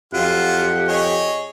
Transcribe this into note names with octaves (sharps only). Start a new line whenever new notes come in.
F2 F#3 F4 G4 F#5
G#4 C#5 D#5